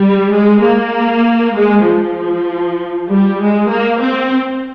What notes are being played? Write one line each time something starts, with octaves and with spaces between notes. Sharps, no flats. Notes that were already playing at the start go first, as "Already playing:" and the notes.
Already playing: G3
G#3
A#3
G#3
F3
G3
G#3
A#3
C4